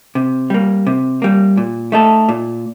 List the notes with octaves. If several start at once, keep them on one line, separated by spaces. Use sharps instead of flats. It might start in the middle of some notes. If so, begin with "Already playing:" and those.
C3
G3 A#3
C3
G3 A#3
A#2
A3 D#4 A4
A#2